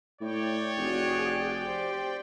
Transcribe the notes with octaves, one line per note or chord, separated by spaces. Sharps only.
A2 C#5 D5 G5
F1 F#4 G#4
G4 C5